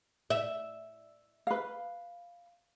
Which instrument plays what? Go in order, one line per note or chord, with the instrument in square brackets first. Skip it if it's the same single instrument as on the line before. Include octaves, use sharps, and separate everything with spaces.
[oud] E5
[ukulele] B4 F5